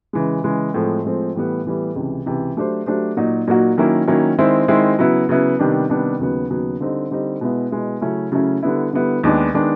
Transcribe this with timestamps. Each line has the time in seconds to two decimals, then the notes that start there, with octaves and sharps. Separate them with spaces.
0.13 C#3 E3 G#3
0.44 C#3 E3 G#3
0.74 A2 F3 G#3 C4
1.05 A2 F3 G#3 C4
1.35 A2 E3 G3 B3
1.65 A2 E3 G3 B3
1.96 C#2 C3 E3
2.26 C#2 C3 E3
2.57 F#3 A3 D4 G4 C5
2.86 F#3 A3 D4 G4 C5
3.17 A#2 F#3 A#3 D#4 F#4
3.47 A#2 F#3 A#3 D#4 F#4
3.78 D#3 F#3 A#3 C#4 E4
4.08 D#3 F#3 A#3 C#4 E4
4.38 D#3 G#3 C4 E4
4.68 D#3 G#3 C4 E4
4.99 C#3 F#3 B3 E4
5.29 C#3 F#3 B3 E4
5.59 C3 D#3 G3 B3 D4
5.89 C3 D#3 G3 B3 D4
6.19 D#2 C#3 F#3 B3
6.50 D#2 C#3 F#3 B3
6.80 D3 G3 C4 D#4
7.11 D3 G3 C4 D#4
7.41 B2 G#3 B3 E4
7.71 B2 G#3 B3 E4
8.01 C#3 F#3 A3 C#4 E4
8.32 C#3 F#3 A3 C#4 E4
8.63 D3 G3 B3 E4
8.93 D3 G3 B3 E4
9.24 D#2 D#3 G#3 B3 D4
9.54 D#3 G#3 B3 D4